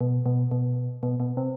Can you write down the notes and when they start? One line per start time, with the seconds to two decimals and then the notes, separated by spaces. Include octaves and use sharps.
0.01 B2
0.26 B2
0.51 B2
1.03 B2
1.20 B2
1.37 C3